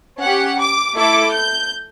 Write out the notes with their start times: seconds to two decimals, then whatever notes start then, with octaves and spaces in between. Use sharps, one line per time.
0.21 C#4 G4 F#5
0.59 D6
0.95 A3 E4 A4 D6
1.32 G6